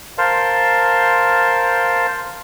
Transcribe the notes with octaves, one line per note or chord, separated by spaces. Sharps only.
A#4 C5 F5 A5 C6